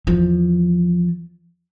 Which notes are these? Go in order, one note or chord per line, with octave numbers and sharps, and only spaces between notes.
E2 F3